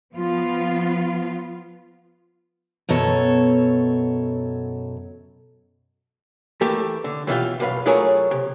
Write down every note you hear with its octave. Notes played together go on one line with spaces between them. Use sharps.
F3 B3 F4
F#2 B2 A4 C#5
E3 A3 G4 A#4
D3
B2 E3 D#4 F4 G4
B1 F#2 B4 F5
F#3 A3 F4 G#4 A#4 C#5
C3